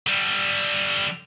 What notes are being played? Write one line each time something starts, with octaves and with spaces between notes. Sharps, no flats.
D3 G3